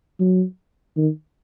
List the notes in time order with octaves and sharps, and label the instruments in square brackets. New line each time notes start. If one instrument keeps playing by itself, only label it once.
[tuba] F#3
D#3